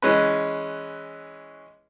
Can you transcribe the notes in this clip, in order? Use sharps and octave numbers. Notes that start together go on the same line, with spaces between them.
E3 G#3 C#4 B4